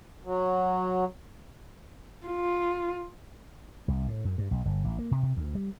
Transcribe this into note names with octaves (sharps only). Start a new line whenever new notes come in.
F#3
F4
C2
A2
F#2
G2
B1
G1
A1
A#3
C3
C3
D2
G3